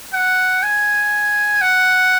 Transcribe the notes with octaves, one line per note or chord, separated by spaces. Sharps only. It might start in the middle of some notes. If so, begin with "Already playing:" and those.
F#5
G#5
F#5